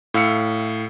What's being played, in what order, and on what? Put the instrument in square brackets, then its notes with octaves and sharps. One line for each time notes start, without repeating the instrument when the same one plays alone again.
[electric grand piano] A2 F5 E6 C#7